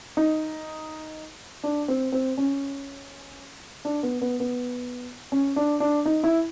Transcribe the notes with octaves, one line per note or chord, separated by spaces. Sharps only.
D#4
D4
C4
C4
C#4
D4
B3
B3
B3
C#4
D4
D4
D#4
E4